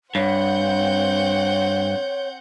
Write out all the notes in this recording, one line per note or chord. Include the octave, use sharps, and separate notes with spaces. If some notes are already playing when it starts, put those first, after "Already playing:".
G2 C4 C#5 F#5 G6